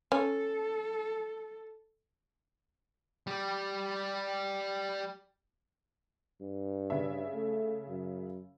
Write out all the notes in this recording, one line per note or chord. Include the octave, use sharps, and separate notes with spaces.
C#4 A4
G3 G4
G2
C#3 E5
A3
F#2